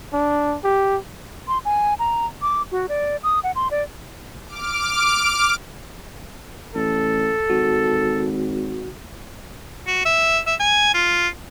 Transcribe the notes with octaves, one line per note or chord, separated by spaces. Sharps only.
D4
G4
C6
G#5
A#5
D6
F#4
D5
D#6
F#5
C6
D5
D6 F6 D7
A1 A4
G#1 F#4
F#4
E5
E5
G#5
F4